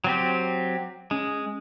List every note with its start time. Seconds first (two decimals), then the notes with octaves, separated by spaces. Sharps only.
0.04 F#3 C4 G4
1.11 G#3 C#4